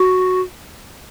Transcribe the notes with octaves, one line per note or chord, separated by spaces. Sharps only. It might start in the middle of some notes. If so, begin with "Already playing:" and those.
Already playing: F#4